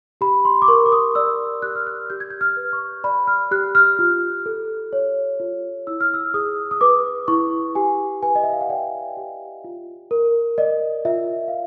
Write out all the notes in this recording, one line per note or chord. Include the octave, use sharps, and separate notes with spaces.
G4 B5
C6
D6
A#4 C#6
D6
D#6
D5 E6
G4 F#6
F6
F#6
G4 G6
G#6
G6
F6
B4
C#6
D5 B5
F6
G4 F#6
F6
F4
A4
C#5
F4
E4 E6
F6
E6
G#4 D#6
D#6
B4 D6
E4 C#6
G4 G#5
B4 G#5
D#5
E5
F5
F#5
D5 G5
G4
F4
A#4
D5 D#5
F4 E5
F5